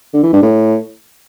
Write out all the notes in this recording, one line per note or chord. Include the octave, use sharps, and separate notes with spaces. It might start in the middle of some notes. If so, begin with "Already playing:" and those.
D3
E3
G2
A2